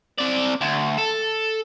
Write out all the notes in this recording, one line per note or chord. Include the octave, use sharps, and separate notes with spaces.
C4 D5
D2
A4